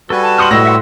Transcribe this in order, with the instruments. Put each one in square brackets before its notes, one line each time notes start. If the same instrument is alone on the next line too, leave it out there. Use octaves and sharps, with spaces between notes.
[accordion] G3 F#4 B4 [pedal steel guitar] A4 G#5
[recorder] A5
[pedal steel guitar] C6 D#6 F6 [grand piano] G6 C#7 F#7
[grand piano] A2 A#6 [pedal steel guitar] C#5 D#5 [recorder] E6
[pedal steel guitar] E5 F#5 C6